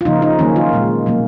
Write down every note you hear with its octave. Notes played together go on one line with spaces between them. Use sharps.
F4
C#3 F3 A#3 D#4
D#4
D#3 F#3 A#3 C#4
F4
A#2 G#3
B2 F#3 A#3